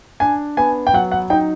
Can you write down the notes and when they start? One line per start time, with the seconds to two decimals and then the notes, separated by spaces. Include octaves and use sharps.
0.20 D4 G#5
0.57 B3 G#5
0.87 G5
0.94 F#3 F#5
1.12 F#5
1.30 D#4 G5